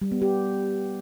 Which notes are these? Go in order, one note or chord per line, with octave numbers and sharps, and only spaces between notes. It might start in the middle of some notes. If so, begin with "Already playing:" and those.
G3
B3
G4